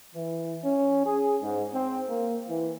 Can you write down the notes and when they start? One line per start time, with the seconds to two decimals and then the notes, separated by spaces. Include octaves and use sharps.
0.15 E3
0.64 C#4
1.06 G#4
1.42 G#2
1.73 C4
2.08 A#3
2.48 E3